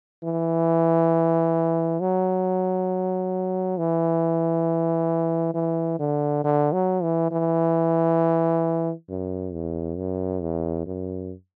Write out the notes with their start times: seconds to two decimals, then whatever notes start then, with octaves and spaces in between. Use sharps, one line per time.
0.24 E3
2.01 F#3
3.78 E3
5.55 E3
5.99 D3
6.44 D3
6.73 F#3
7.03 E3
7.32 E3
9.09 F#2
9.54 E2
9.98 F#2
10.42 E2
10.87 F#2